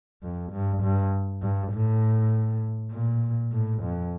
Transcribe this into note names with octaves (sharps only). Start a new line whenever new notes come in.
F2
G2
G2
G2
A2
A#2
A2
F2